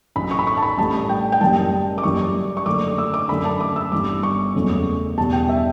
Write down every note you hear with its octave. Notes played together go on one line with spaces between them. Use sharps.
A1 A2 F#3 B5
C#6
B5
C#6
A5
B5
A1 A2 G3 A5
G5
G5
F#1 F#2 E3 G3 A5
D6
F#1 F#2 E3 G3 C#6
C#6
F#1 F#2 D3 A3 D6
E6
D6
F#2 D3 A3 B5
A5
D6
E6
G1 G2 E3 G3 D6
C#6
F#1 E2 C#3 F#3 A3
E2 B2 G3 A5
G5
E5